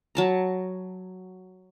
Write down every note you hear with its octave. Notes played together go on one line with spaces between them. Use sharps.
F#3 A5 A#5